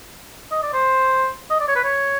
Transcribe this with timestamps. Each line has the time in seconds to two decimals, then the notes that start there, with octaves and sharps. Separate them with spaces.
0.51 D#5
0.62 D5
0.73 C5
1.50 D#5
1.60 D5
1.68 C#5
1.75 B4
1.84 C#5